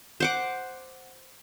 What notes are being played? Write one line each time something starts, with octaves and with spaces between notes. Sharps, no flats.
C5 F#5 D6